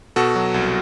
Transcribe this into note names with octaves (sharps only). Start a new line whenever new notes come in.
B2 F#4 A4
F#3
C2